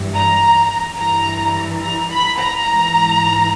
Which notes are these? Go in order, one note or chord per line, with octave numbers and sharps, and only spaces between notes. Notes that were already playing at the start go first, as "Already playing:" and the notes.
Already playing: G2 E3
A#5
G2 E3 A#5
A#5
B5
A#5
G#2 E3